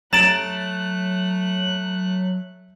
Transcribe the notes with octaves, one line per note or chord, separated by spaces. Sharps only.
F#3 A3 A#5 F#6 A6 D7 E7 F#7